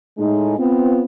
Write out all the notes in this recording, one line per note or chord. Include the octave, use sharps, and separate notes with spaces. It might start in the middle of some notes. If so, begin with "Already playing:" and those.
A2 G#3 D#4
B3 C4 F4